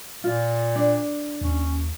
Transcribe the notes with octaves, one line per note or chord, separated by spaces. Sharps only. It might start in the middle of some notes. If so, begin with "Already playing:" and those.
A#2 F4
D4
D#2 C#4